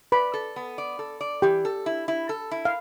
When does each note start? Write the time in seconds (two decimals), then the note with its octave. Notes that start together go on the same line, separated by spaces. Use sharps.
0.12 B4 D5 B5
0.34 A4
0.56 B3
0.78 D5
0.99 A4
1.21 D5
1.42 E3 G4 G5
1.65 A4
1.86 E4
2.08 E4
2.29 A4
2.51 E4
2.65 F5